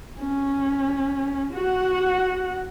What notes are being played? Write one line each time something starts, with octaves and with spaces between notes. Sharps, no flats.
C#4
F#4 F#5